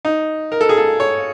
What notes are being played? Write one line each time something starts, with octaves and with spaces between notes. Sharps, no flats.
D#4
A#4
A4
G#4
A4
C#5